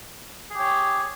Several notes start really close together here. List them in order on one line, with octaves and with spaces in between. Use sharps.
G#4 G4 C#5